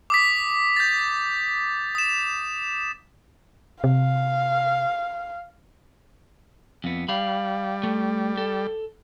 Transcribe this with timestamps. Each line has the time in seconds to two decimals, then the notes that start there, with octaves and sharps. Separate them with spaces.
0.10 D6 D#6 B6
0.76 G6 A6
1.95 D#6 E7
3.84 C3 F5
6.84 F2 B3
7.08 G3 F5 B5
7.83 A3
8.37 A4